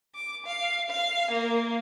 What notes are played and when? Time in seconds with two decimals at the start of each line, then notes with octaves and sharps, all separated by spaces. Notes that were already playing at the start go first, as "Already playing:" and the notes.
0.15 D6
0.46 F5
0.90 F5
1.31 A#3